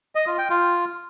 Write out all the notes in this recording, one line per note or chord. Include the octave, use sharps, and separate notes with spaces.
D#5
F4
G5
F4